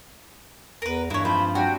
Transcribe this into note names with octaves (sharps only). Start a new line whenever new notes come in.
E2 A#4 B4
G2 E3 G#3 A#3 E4 C#5
F3 C4 D#4 C5 B5
F#3 G3 D4 F#4 G5